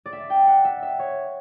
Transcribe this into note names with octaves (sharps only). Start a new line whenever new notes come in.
D5
E5
G5
F#5
E5
E5
C#5